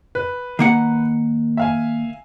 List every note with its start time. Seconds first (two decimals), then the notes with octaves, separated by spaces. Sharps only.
0.15 B4
0.59 D#3 A#3 F#5
1.57 E5 F5 G#5